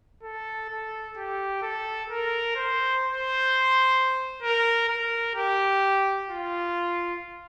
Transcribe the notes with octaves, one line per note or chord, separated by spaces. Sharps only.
A4
A4
G4
A4
A#4
C5
C5
A#4
A#4
G4
F4